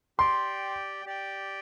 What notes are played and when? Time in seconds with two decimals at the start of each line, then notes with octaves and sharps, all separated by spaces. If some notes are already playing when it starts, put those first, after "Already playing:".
0.18 G4 D5 G5 C6
1.05 G4 D5 G5